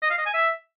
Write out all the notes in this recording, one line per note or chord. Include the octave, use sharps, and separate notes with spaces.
D#5
F5
D#5
G#5
E5